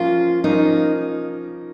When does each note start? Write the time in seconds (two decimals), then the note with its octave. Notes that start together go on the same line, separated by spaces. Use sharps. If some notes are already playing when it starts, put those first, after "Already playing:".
Already playing: F3 A#3 C#4 F4 A#4
0.44 F3 A#3 C#4 D#4 A#4